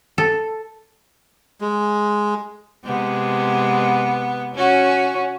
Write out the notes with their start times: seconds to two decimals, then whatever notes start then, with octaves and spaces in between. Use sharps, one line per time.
0.18 A4
1.61 G#3
2.84 C3 G#3 B3
4.55 C#4 F#4